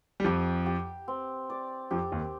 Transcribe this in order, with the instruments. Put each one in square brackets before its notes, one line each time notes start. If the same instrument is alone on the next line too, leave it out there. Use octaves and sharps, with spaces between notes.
[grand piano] G3
[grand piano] F2 F3 [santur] G4
[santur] G4
C4
D5
[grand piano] F2 F3 [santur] G4
[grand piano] D#2 D#3